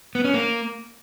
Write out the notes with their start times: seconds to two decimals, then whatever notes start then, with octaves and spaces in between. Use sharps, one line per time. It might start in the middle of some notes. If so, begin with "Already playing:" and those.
0.15 B3
0.24 C#4
0.34 A#3